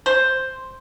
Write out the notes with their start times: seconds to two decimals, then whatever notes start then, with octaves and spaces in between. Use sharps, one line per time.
0.06 C5